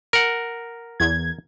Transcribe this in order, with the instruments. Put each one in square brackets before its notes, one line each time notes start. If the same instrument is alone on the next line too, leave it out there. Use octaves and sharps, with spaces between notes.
[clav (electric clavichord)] A#4 F#5
[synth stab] E2 G#6